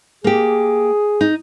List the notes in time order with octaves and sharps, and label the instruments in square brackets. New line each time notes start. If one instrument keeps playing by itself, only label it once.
[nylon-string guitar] A#3 G4 [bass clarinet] G#4
[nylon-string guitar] D#4